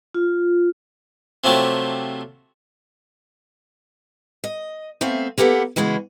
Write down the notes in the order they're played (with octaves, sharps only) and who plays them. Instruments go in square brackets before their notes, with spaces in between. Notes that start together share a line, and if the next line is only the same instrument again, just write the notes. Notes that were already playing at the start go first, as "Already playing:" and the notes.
[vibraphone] F4
[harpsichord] C3 F3 F#3 A3 G4
[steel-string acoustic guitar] D#5
A3 B3 C4 E5 F5
A#3 B3 G4 A4 F#5
C#3 E3 G#3 B3 F#4